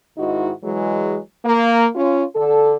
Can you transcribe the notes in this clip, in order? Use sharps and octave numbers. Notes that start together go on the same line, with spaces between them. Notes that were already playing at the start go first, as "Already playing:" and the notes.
G#2 D#3 D#4 E4 F#4
E3 F#3 G#3
A#3
C#4 F4
D3 A4